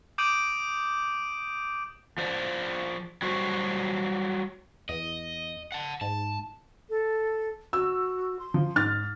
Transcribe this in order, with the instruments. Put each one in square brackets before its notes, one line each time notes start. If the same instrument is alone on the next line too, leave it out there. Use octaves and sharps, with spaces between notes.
[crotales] D6 D#6 G6 D7 D#7 F#7
[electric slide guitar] F3 C5 D5
F#3 G3 F#4 C5
[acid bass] E2 [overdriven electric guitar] D#5
[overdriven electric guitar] F#5 A5
[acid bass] G#2 [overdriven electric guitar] A5
[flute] A4
[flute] F#4 [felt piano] E6
[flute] C6
[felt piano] F3
G#2 F6 A6